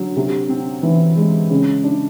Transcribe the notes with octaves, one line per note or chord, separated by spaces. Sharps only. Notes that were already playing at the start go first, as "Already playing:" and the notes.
Already playing: D3 F#3
C3
C4
E3
G#3
C#3
D4